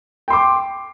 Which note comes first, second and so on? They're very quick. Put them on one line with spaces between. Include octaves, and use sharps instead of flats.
G5 C6 D6